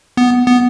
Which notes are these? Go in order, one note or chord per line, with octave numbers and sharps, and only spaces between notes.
B3
B3